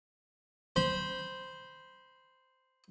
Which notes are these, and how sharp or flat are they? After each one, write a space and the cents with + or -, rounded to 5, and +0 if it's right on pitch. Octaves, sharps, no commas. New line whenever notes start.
C5 -5 B5 -25